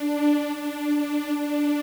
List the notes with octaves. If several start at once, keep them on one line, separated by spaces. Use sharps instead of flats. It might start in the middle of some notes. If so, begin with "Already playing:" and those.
Already playing: D4
D4
D4
D4